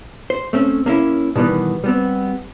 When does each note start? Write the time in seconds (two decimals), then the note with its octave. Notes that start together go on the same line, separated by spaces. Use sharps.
0.30 C5
0.53 A3 C4 C#4
0.86 A#3 C#4 E4
1.35 B2 D#3 E3 G3 B3
1.84 G3 B3 C4